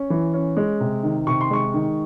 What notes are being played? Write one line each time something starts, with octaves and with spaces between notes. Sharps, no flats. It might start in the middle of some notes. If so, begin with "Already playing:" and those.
Already playing: C#4
E3
C#4
G#3
C3
D#3
C3 C#6
C6
G#3 C#6
D#3